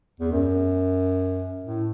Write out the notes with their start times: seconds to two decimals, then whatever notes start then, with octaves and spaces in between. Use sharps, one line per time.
0.20 E2
0.32 F#2
1.64 A2